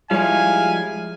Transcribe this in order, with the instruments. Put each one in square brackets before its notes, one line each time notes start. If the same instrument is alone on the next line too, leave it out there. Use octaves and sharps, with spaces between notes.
[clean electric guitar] F3 G3 [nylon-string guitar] G#3 C#5 [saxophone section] D#4 E4 F5 [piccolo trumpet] G#5